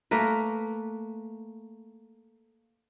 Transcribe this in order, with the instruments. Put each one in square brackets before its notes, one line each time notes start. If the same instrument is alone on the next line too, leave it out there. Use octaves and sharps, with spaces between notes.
[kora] A3 A#3 A#4 B4